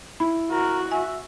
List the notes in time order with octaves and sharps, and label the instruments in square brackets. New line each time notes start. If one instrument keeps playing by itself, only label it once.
[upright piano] E4 [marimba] B5
[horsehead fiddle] F#4 [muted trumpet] A#4
[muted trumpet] E5 [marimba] G#5